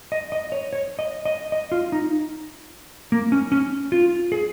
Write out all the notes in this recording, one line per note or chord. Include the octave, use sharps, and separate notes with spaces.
D#5
D#5
C#5
C#5
D#5
D#5
D#5
F4
D#4
A#3
C#4
C#4
F4
G#4